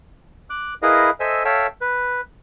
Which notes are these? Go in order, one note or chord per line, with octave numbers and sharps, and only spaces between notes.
D6 F#6
E4 G#4 A#4 B4 D#5 F5
A4 C5 D#5 E5 G#5 E6
A4 C#5 E5 F5 G5 A5
B4